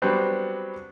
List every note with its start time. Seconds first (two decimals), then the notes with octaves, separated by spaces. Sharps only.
0.02 F#3 G3 B3 C4 D4